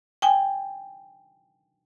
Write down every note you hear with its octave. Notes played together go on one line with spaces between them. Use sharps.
G5 G#5